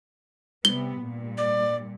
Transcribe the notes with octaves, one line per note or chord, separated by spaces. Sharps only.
C3 G3 B3 G7
G2 A#2
D5